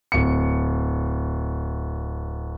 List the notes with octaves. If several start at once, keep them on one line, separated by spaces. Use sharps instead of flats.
D1 C#7